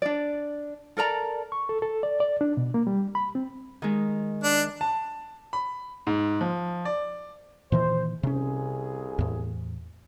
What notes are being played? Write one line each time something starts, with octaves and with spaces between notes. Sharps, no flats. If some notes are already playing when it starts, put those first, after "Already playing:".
D4 D5
A4 A#4 D5 A#5
C#6
A4
A4
D5
D5
D4
B2
A#3
G3
B5
C4
D#3 G#3
D4
A5
B5
G#2
F3
D5
A#2 D#3 E3 C5
C2 C3 C#4 G#4
E2 A2